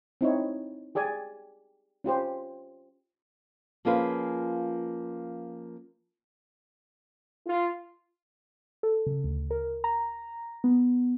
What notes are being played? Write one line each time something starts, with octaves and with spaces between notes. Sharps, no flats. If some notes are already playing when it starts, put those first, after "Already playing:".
C4 D#4 E4 C#5
G4 G#4 D5 G#5
C#4 F4 G4 C5
F3 A#3 C#4 F4 G#4 B4
F4
A4
C#3
D2
A#4
A#5
B3